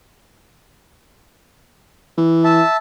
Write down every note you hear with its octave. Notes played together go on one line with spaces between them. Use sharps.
E3
E5 A5